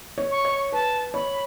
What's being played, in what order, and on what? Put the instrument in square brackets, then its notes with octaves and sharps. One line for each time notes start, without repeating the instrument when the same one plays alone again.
[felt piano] C#5
[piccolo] C#6
[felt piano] C#5
[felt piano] B4 [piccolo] A5
[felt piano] C#5 [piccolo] B5